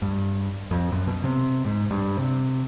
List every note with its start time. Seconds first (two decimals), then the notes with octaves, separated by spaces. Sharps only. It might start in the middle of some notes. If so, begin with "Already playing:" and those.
0.02 G2
0.71 F2
0.92 F#2
1.07 B2
1.24 C3
1.65 G#2
1.91 G2
2.19 C3